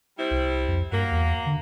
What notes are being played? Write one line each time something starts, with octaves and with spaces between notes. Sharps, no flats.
G3 C4 E4
C2
F2
G2 F#3 A#3
E2
D3